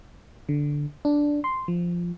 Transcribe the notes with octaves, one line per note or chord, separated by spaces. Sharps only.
D3
D4
C6
F3